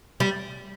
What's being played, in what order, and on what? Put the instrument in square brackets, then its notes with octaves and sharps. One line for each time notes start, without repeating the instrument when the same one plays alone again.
[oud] G3